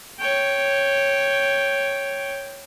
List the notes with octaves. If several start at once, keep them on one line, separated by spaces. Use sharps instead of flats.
C#5 G5